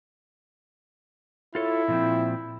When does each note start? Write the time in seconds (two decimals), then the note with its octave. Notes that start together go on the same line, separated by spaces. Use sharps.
1.55 E4 F4 A4 C#5
1.88 A#2 F3 C4